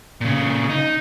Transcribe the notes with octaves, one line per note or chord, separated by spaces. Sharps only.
A#2 C#3
D#4